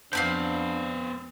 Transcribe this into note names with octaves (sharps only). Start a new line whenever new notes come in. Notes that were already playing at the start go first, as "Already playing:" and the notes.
F2 B3 D4 C5 F5 B5 G6